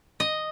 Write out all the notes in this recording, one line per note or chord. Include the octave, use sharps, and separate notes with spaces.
D#5